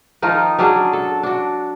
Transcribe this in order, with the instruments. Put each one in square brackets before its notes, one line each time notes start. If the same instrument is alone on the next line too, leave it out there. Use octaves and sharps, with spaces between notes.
[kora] D#3 F3 D#4 F4
F#3 C#4 D4 G#4
A4
D4 F#4